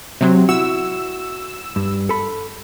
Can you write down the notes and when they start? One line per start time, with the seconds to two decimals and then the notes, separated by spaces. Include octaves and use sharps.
0.21 C3 F#3 C4
0.49 E4 F#4 E6
1.76 G2
2.09 A4 B5